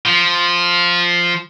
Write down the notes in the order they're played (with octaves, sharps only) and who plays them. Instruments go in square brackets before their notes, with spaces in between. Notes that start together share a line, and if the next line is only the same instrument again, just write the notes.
[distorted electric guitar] F3